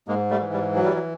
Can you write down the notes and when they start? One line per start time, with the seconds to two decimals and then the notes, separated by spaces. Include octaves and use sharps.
0.08 G#2 G#3 A#3
0.31 G3 A3
0.41 E3
0.53 G3
0.75 F#3
0.84 G3
0.94 F#3